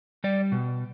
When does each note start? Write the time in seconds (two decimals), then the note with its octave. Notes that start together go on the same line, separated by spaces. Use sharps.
0.24 G3 D5
0.52 B2